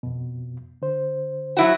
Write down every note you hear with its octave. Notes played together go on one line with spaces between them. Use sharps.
F2 B2
D3 C5
F#3 E4 F#4